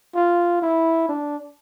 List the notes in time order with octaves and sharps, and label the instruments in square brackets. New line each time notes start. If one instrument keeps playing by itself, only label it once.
[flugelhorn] F4
E4
D4